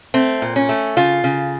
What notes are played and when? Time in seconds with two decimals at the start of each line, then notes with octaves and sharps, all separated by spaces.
0.14 A3 C4
0.42 A#2
0.56 C#4
0.69 A3
0.97 C#3 F4
1.24 C#3